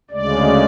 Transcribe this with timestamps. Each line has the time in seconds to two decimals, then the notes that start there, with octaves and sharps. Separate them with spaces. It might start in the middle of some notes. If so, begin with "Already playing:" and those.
0.10 D2 C#3 G#3 D5